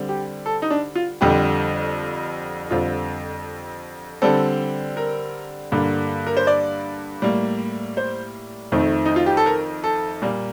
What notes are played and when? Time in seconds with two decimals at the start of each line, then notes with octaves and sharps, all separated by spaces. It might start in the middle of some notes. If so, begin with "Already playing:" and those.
Already playing: D3 G3 C4
0.09 G4
0.46 A4
0.62 D#4
0.70 D4
0.95 F4
1.21 F2 D3 G3 G4
2.71 F2 D3 G3 C4 F4
4.22 D3 G3 C4 A4
4.97 A#4
5.72 G2 D3 G3 A#3
6.27 A#4
6.37 C5
6.47 D5
7.22 A2 G3 A#3
7.97 C5
8.72 F2 D#3 A3 C4
9.06 D#4
9.16 F4
9.26 G4
9.37 A4
9.46 A#4
9.84 A4
10.22 A#2 G3 A#3